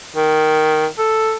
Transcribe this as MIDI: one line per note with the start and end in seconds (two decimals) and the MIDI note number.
0.16 0.86 51
0.98 1.37 69